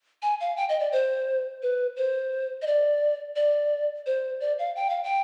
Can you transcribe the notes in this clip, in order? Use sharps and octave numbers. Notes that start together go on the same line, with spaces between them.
G#5
F5
G5
D#5
D5
C5
B4
C5
D#5
D5
D5
C5
D5
F5
G5
F5
G5